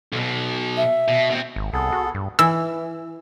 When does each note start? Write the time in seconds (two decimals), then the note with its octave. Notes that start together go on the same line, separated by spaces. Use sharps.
0.12 B1 B2
0.77 E5
1.08 B2
1.31 B2 C4
1.56 G#1
1.73 C2 B3 G#4 A4
1.92 F#4
2.14 G2
2.39 E3 E6